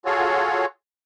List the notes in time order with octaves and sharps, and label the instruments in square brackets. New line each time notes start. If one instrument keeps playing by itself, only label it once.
[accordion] F4 F#4 G#4 A4 C#5